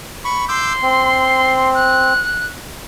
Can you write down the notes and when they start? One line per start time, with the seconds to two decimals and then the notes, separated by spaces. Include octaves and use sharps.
0.25 B5 C#6
0.49 C6 D6 E6 G6
0.82 C4
1.74 F#6